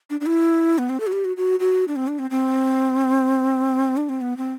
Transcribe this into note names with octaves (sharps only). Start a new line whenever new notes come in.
D4
D4
E4
B3
C4
A4
F#4
G4
F#4
F#4
F#4
D4
C4
D4
C4
C4
D4
C4
B3
C4